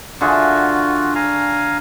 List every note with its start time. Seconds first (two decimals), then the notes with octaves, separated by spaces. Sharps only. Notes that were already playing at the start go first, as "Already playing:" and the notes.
0.21 D3 F4 F#4 G#4 E5
1.15 F5 G#5 A#5